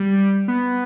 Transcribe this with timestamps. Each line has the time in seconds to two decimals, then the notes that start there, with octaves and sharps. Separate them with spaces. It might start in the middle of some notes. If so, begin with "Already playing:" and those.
Already playing: G3
0.48 B3